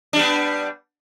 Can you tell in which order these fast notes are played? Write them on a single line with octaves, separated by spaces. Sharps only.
D4 G3 B3